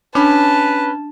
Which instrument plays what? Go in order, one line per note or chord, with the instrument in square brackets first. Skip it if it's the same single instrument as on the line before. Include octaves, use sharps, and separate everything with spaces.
[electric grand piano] C#4 B5 [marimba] D4 [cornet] B4 [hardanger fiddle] A5